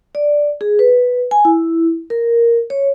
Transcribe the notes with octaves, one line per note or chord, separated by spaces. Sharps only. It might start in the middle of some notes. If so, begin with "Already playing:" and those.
D5
G#4
B4
G#5
E4
A#4
C#5